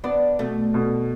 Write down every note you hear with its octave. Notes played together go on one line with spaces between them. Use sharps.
B3 D4
B2 A3
B2